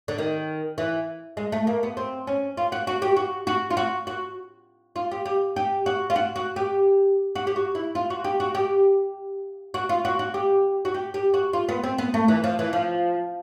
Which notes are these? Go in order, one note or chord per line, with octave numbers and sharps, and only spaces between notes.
D3
D#3
E3
G#3
A3
A#3
B3
C4
C#4
F4
F#4
F#4
G4
F#4
F#4
F4
F#4
F#4
F4
G4
G4
G4
F#4
F4
F#4
F#4
G4
F#4
G4
F#4
E4
F4
F#4
G4
F#4
G4
F#4
F4
F#4
F#4
G4
F#4
G4
G4
F#4
F4
B3
C4
B3
A3
E3
F3
E3
F3